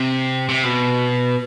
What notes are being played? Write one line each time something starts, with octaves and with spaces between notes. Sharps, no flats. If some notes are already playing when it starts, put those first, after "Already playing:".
Already playing: C3
C3
B2